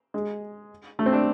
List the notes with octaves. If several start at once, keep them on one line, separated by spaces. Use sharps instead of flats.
G#3
A3
C4
D4